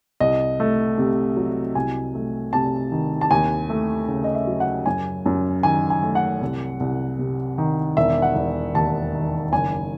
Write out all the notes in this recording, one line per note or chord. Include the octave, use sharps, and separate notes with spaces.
C2 D#5
A3
C3
F#3
C2 G#5
A3
C3 A5
D#3
A5
D#2 G#5
A3
C#3
D#5
E5
F#3
F#5
F#2 G#5
F#2
D#3 G#5
G#5
A3
F#5
C2
C2
C3
D#3
E1 E5
F#5
E1
D#2 A5
D#3
F#1 G#5